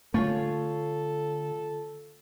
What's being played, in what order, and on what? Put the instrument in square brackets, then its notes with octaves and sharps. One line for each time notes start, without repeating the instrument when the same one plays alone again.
[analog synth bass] D3 [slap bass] A3 [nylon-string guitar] F4 G#4 C#5 [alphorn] A4